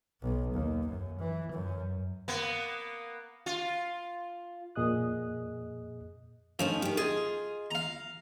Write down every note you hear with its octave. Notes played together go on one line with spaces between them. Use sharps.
B1
D#2
F#2
E3
F#2
A#3 B3
F4
F2 A#2 G#4 D#5 D#6 F#6
F3 A3 C#4 D#4
D#3 G4
F4 G#4 D#5
F5 A#5